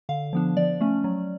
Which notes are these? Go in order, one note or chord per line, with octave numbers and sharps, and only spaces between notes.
D3 F5
F3 B3 D4
F3 D5
A3 C#4
F#3